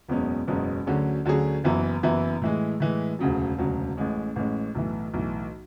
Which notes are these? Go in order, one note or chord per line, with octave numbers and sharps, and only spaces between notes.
F#1 E2 B2 G#3 C#4
F#1 E2 B2 G#3 C#4
D2 D3 F#3 C#4 G#4
D2 D3 F#3 C#4 G#4
F#1 F#2 E3 B3 E4
F#1 F#2 E3 B3 E4
A2 E3 G#3
A2 E3 G#3
E1 D2 C#3 F#3
E1 D2 C#3 F#3
A1 A2 G#3 C#4
A1 A2 G#3 C#4
B1 A2 E3
B1 A2 E3